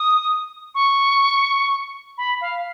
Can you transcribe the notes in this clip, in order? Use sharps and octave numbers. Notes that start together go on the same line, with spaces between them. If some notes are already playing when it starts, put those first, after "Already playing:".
Already playing: D#6
C#6
B5
F5